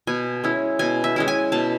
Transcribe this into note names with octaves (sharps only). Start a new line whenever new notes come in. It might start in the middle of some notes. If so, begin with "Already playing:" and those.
B2 G#5
G#3 C#4 E4
B2 G#5
E5
G#3 C#4 E4
G#5
B2 A5